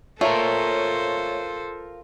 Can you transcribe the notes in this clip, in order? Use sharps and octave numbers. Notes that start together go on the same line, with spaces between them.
A3 F4 A4 A#4 C5 C#5